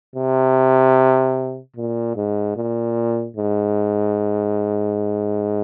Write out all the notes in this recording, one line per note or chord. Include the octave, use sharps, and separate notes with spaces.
C3
A#2
G#2
A#2
G#2